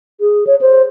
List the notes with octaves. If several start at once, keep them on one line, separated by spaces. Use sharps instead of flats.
G#4
C#5
C5